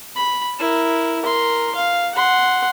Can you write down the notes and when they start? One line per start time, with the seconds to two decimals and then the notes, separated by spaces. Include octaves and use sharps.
0.15 B5
0.59 E4 A#4
1.21 A#4 C6
1.75 F5
2.15 F#5 C6